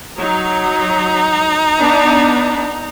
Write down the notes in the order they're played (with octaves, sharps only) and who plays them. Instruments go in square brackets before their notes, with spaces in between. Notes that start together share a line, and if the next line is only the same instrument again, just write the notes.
[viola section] F#3 [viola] D#4 A#5
[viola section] B3 D4